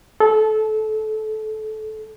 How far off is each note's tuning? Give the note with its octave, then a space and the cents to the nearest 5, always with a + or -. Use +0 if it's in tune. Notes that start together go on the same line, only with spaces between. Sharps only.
A4 -20